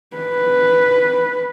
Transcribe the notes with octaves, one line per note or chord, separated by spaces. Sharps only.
B4